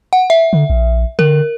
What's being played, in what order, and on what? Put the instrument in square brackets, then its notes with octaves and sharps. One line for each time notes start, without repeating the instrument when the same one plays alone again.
[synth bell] F#5
E5
[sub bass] D3
A#1
[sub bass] D3 [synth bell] A#4